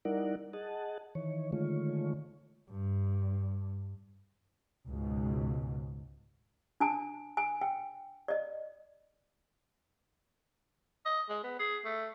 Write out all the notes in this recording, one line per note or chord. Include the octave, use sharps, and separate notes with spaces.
G3 D#4 E4 A#4 D5 F#5
G#4 D#5 F#5 A5
D#3 E3 C#5
D3 D#3 G#3 A3 F4 C#5
G2
C#2 G#2 B2
D4 G#5 A5
G#5
G5
D5 D#5
D#5
G#3
B3
G#4
A3